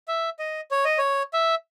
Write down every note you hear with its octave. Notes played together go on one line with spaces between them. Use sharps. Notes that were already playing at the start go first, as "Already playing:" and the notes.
E5
D#5
C#5
D#5
C#5
E5